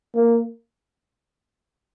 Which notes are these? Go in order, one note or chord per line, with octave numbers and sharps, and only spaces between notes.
A#3